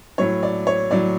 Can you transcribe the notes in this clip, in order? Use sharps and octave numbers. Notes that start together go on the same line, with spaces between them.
A2 F#3 C#5
D5
C#5
A2 F#3 D5